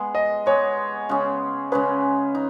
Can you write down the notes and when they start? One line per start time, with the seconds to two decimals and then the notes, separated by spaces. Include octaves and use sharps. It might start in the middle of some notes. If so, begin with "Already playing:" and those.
Already playing: G#3 B3 G#4
0.15 D#5
0.46 G#3 B3 G#4 C#5
1.09 C#3 G#3 C#4 G#4
1.72 C#3 G#3 C#4 G#4 B4
2.35 D#4